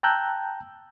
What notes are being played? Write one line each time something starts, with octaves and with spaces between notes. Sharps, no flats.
G5 A5 A#5 E6 F#6 G6